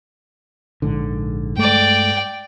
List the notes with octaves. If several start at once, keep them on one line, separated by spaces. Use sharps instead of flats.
A#1 G#2 D3
G2 G#3 A3 D5 G5